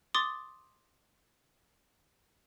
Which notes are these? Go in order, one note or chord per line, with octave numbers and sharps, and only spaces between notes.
C6 D6 D#6 A6